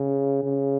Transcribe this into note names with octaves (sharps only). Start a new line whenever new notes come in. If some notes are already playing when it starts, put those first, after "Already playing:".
Already playing: C#3
C#3